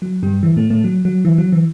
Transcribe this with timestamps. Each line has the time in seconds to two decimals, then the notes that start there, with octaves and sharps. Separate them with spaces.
0.02 F#3
0.23 G2 G3
0.43 E3
0.56 A2 A3
0.70 A2 A3
0.84 F#3
1.05 F#3
1.25 E3
1.38 F#3
1.52 E3